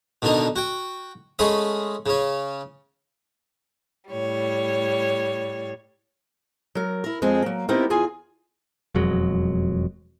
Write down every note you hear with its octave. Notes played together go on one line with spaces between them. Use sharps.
B2 D3 D#3 D4 D#4
F#4 G5
G#3 A3 C#4 B5 D#6
C#3 C#4
A2 G3 C#5
F#3 A#4
E4 A#4
F2 G#3 C4 G#4 G#5
F#3 A#3
B3 C4 D#4 E4 G4 A#4
E2 F4 G#4 G#5
E1 F2 F#3 G#3